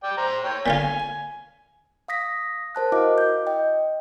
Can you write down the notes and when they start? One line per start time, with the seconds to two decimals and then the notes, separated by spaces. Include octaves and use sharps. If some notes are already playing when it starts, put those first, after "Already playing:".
0.03 D5 G5
0.17 C5 A#5
0.44 C#5 G5
0.66 A#2 D3 F4 G#5
2.08 F5 D#6 A#6 B6
2.75 A#4 C5 A5 F#6
2.92 E4 F#4 A#4 D#5 F5 D6
3.18 G6
3.47 D#5 G5